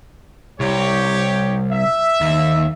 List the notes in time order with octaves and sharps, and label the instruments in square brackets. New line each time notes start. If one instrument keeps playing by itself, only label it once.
[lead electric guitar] C2 [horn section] G4 C#5
[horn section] E5
[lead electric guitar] D#2